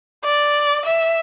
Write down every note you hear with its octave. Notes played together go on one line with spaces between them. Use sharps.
D5
E5